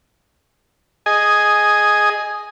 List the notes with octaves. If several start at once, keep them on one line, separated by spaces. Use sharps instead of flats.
G#4 D#5 G#5